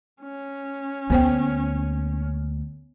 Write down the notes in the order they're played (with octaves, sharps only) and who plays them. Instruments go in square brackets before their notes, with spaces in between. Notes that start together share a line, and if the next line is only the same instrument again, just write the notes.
[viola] C#4
[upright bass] D2 A#3 [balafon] B3 C5 G5